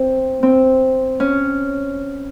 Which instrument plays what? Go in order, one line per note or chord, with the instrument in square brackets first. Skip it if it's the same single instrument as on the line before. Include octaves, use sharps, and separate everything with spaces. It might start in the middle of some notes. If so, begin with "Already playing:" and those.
Already playing: [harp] C4
C4
C#4